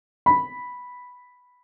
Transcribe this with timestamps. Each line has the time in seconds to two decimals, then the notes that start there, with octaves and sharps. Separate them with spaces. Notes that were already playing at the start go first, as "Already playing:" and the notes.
0.26 B5